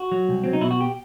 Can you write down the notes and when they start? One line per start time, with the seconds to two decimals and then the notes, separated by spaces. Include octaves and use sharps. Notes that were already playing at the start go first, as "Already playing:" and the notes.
Already playing: F#4
0.12 F#3
0.29 C2
0.44 F#3 C4
0.53 D#4
0.61 B2 E4
0.71 F#4
0.81 G4